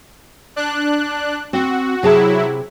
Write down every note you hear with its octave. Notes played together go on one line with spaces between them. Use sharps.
D4 F#6
C4 F#4
C3 F#3 E4 G#4 A5